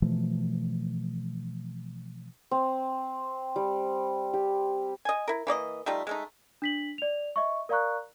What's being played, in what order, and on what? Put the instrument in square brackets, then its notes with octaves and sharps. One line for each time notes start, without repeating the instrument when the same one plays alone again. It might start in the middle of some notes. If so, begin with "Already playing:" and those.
[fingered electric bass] B2 E3 F3 A3
[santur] C4
G3
G4
[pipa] D#5 G#5
E4 A#4
E3 A#3 D5 D#5
G3 A3 D#4 F4
G#3 A3 D#4
[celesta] D4 B6 F#7
D5 F7
D#5 E5 C#6
A#4 D5 F5 A#5 C#6 F#6